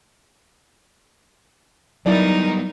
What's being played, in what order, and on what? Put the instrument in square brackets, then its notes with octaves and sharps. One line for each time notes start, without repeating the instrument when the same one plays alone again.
[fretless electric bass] F#3 [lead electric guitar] G3 B3 [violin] D#4 A#4 [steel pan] E4 D5